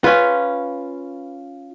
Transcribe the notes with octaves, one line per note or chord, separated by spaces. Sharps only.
C#4 F4 B4